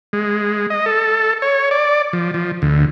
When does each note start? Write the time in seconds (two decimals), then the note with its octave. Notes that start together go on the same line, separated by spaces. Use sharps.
0.13 G#3
0.70 D#5
0.86 A4
1.42 C#5
1.71 D5
2.13 F3
2.34 F3
2.62 D2